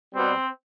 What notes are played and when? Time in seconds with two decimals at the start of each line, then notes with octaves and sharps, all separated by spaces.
0.14 B2 G3 C4